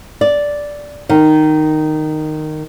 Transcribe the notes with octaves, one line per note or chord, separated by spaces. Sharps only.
D5
D#3